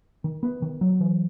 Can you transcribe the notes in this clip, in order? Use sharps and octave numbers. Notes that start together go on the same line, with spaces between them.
D#3
B3
D#3
F#3
E3